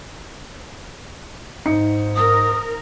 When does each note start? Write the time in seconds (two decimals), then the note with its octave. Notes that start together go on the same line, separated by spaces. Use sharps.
1.66 G#2 D#4 C#7
2.16 A#4 D#6